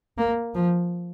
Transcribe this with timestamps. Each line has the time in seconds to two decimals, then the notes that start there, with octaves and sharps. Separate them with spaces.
0.18 A#3
0.54 F3